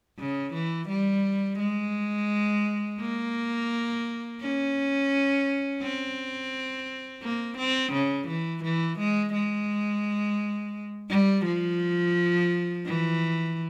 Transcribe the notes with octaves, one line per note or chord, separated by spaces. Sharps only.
C#3
E3
G3
G#3
A#3
C#4
C4
A#3
C4
C#3
E3
E3
G#3
G#3
G3
F3
E3